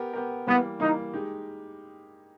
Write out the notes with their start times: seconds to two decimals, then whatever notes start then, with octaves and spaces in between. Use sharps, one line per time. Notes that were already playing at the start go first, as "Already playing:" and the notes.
Already playing: B3 G4 A#4
0.13 B3 G4 A#4
0.47 E3 G3 A#3 B3
0.80 E3 G3 A#3 D#4
1.14 G#3 D#4 G4